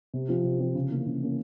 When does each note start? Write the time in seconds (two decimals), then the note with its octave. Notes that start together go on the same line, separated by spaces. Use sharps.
0.14 C3
0.28 F3 C4 F4
0.44 C3
0.60 F3 C4 F4
0.75 C#3
0.91 E3 A#3 C#4
1.06 C#3
1.22 E3 A#3 C#4